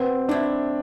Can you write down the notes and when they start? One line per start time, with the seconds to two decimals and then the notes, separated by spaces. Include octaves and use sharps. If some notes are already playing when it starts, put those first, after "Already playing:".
Already playing: B2 C4
0.29 A3 D4 E4